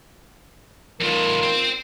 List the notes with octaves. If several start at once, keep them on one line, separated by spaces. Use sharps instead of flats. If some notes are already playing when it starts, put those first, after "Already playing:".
E2 A2 D#4 F4 A#4
C5 G5